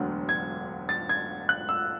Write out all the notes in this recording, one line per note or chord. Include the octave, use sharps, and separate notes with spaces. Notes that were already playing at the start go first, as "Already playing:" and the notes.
Already playing: E1 D2 D3 F#3
G#6
A6
G#6
F#6
E6